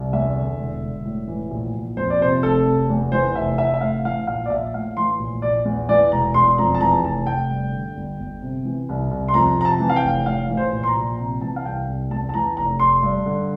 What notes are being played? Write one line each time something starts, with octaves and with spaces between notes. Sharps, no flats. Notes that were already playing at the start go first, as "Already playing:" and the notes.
Already playing: C2
E2 E5
D3
E1
E1
A2
E3
A#1
A#1
F2 C5
D5
C3 C5
F1 A4
F1
E2
E3 C5
F1 E5
F1 E5
E5
A2 F5
E3 F5
A#1 F5
D5
A#1 E5
A2 F5
E3 C6
A#1
A#1 D5
E2
E3 D5
E1 A#5
E1 C6
F2 A#5
A5
E3 A#5
F1 A5
F1 G5
G2
D3
G1
G1
C3
E3
C2
C2
C6
F2 A#5
C3 A#5
A5
E3
F5
G5
F1
A2 F5
E3
C5
A#1
C6
A#5
A#1
C3 A#5
E3 A5
F5
C2 G5
C2
E2 A5
A5
E3 A#5
F1 A#5
F1 C6
G2
D3